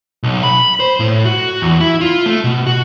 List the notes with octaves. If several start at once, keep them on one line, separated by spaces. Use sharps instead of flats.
B1
B5
C5
A2
F#4
E2
E4
F4
A3
B2
F#4